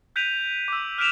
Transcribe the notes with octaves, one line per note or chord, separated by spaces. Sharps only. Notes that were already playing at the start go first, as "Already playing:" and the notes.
F#6 G6 B6 D7 D#7 F7
D6 E6
F6 F#6 B6 D7 E7 F7